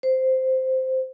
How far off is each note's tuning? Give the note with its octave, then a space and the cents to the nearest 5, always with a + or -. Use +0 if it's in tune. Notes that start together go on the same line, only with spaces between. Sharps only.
C5 -5